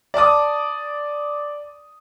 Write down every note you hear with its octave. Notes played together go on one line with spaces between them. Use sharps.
D5 A5 D6 D#6